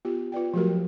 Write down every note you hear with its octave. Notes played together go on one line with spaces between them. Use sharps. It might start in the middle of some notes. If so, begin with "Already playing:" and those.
B3 F4 G4
F4 B4 D5 G5
F3 F#3 A3 F#4 G4 A#4